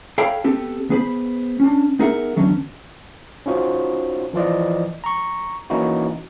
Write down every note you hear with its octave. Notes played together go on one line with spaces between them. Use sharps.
A4 C#5 F5 G5 B5
B3 C4 G4 A4
B3 G#4 B4 C5 B5
C#4 D4
B3 D#4 G#4 A#4 E5 F#5
E2 D3 F#3 B3 C#4
C#4 D#4 F4 F#4 C5
E3 F3 F4 D5 D#5
A#5 C#6
E3 A#3 C#4 D#4 E4 F#4